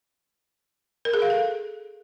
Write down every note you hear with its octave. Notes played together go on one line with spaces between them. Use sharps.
A#4
G#4
F5
A4